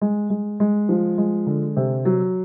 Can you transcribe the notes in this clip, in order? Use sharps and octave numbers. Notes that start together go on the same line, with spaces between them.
G#3
G#3
G#3
F3
G#3
D3
C3
F#3